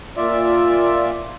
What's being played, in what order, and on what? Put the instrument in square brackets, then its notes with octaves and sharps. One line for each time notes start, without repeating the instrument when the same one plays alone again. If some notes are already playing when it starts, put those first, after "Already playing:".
[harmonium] A#2 F4 D5 E5